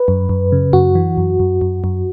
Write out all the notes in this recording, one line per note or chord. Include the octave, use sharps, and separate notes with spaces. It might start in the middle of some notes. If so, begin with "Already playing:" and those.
Already playing: B4
F#2
F#2
C#3
F#2 F#4
E3
F#2
F#2
F#2
F#2